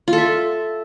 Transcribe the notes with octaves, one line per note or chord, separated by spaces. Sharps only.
F4
A4
E5